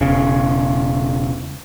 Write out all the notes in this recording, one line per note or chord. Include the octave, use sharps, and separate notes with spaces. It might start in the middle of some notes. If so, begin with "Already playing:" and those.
E1 C#3